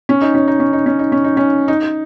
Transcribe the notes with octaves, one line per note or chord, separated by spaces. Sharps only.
C#4
D#4
C#4
D#4
C#4
D#4
C#4
D#4
C#4
D#4
C#4
D#4